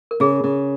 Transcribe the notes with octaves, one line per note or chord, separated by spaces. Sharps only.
A#4
C#3 G#4
C#3